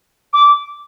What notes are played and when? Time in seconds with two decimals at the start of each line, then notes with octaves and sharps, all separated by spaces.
0.33 D6